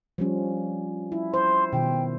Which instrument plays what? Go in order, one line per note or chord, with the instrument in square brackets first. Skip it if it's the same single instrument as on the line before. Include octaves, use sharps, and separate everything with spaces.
[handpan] F3 G3 C#4
E4
[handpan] C5 [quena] C6
[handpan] B2 D#3 [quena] G5